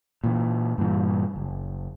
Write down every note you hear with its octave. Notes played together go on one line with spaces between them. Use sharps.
A#2 E3
G2 A#2 E3
F#1